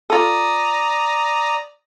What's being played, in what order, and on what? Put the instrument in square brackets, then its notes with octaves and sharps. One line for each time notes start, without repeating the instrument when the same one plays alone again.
[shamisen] F4 A4 [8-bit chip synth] D5 A#5 D#6